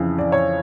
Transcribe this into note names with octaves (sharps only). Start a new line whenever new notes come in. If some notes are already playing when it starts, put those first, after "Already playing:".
Already playing: F2 C#3 E3
D5
C#5